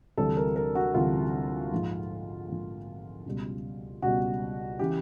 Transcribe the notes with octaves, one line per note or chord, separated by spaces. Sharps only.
D2 C3 E3 G3 A4
A#4
A#4
F#4
D2 C3 E3 G3 F4
A#1 G#2 F3
A#1 G#2 F3
C#2 B2 G3
C#2 B2 G3 F#4
C#3 E3 G4